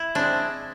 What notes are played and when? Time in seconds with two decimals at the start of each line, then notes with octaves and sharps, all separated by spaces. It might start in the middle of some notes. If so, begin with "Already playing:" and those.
Already playing: E4
0.15 G#3 C4 D4